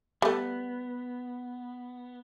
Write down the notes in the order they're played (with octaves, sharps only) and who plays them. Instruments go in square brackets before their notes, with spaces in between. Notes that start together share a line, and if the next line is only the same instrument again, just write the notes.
[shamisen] G3 A3 [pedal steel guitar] B3